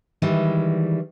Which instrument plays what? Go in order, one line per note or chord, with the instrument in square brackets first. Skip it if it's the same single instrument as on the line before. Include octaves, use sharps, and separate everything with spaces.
[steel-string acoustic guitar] D#3 E3 G3 G#3